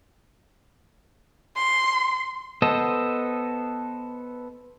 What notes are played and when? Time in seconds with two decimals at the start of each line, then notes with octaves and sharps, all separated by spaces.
1.57 C6
2.62 B3 A4 C5 D#5